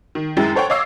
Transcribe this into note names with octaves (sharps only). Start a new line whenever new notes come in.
D#3
F#2 G#3 E4 G5 A6
A4 C5 C#5 F#5 G5
C#5 D#5 F5 D6 E6 C7